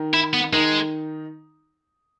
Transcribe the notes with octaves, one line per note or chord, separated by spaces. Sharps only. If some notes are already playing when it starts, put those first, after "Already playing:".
Already playing: D#3 D#4
E4
B3
D#3 G#3 D#4